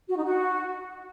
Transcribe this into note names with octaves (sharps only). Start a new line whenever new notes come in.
F#4
D#4
F#4